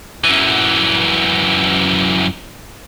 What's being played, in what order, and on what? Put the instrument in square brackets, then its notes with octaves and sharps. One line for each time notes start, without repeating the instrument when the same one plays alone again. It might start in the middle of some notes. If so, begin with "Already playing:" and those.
[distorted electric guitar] F#2 E3